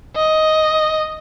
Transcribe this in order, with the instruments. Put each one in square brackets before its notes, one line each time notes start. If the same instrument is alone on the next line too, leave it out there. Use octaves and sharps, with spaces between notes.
[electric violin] D#5